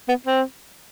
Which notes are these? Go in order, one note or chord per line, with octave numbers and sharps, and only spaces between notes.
B3
C4